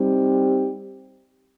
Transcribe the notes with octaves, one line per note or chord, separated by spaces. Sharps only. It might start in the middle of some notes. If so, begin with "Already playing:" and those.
Already playing: G3 C4 D#4 G4